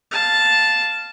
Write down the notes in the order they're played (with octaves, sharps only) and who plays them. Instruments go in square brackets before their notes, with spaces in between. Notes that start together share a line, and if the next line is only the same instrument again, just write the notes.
[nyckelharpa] F5 A5